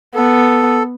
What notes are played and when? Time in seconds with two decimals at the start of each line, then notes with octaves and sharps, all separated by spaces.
0.16 B3 A4